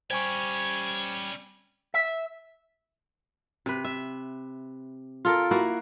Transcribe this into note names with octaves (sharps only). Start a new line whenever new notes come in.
G3 C#4 G4 C5 G#5 C#6 G#6
E5
C3 B4
E5
F4 A4 A#4
A#3 E4 F#4